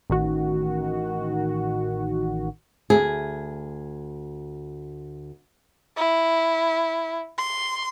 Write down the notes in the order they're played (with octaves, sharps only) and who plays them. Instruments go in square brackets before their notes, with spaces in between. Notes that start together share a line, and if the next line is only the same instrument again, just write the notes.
[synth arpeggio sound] A1 D#3 F#4
[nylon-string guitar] D2 G#4
[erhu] E4
C6